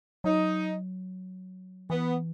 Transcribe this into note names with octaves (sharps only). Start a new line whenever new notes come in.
F#3 D#4
E3 B3